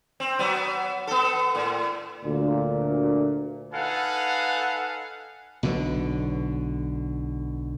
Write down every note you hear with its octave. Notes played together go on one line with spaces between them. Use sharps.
C4
F#3 B3
B3 A4
A2
D2 A#2
D#4 A4 B4 F5 F#5 G#5
B1 B2 D3